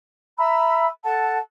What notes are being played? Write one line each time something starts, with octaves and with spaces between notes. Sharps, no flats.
E5 A#5 B5 E6
A4 F#5 A5